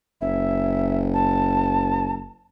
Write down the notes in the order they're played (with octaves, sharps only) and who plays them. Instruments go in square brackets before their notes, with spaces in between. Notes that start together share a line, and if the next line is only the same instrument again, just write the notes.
[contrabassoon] F#1 [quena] E5
[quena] A5